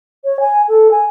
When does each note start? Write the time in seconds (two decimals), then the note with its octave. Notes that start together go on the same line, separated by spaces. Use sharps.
0.24 C#5
0.40 G#5
0.69 A4
0.91 G#5